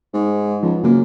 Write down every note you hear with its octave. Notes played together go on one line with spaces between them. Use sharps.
G#2
C#2 F3
F#2 C#3 A#3